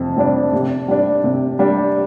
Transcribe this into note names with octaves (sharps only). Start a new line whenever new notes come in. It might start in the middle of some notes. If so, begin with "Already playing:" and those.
Already playing: F2 C3
C3 G3 D4
C3
G3 D4
C3
G3 D4